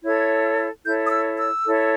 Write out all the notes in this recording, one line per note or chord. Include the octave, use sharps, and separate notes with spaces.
E4 A4 C#5 G#6
E4 A4 C#5 G6
D#6
E6
E6
E4 A4 C#5